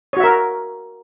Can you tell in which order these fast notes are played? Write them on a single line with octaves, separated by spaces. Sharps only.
C#5 F#4 E5 A#4